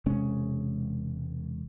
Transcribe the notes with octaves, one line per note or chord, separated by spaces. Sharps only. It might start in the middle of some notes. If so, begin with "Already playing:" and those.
E1 C3 G#3 C#4